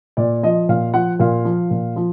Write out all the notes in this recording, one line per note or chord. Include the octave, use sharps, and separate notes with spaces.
A#2 D5
F3 D#5
A#2 F5
F3 F#5
A#2 F5
F3
A#2
F3